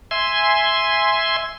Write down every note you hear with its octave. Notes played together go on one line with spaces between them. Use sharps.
E5 G#5 C6